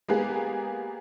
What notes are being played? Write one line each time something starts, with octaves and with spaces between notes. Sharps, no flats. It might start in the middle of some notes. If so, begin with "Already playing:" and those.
G#3 A#3 B3 G4 G#4